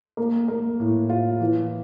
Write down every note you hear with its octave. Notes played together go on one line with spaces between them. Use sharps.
A#3
A#3
A2
F4
E3